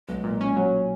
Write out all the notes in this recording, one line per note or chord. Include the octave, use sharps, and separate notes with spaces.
B1 G#3
A#2
C#4
F#3